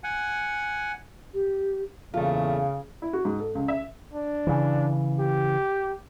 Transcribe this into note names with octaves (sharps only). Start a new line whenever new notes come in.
F#5 G#5
G4
E2 A#2 C#3 A3 F4 A4
E4
F#4
G#2
A4
C#2
E5
D4
C#3 E3
G4